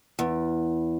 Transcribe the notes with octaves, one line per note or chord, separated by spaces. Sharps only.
E2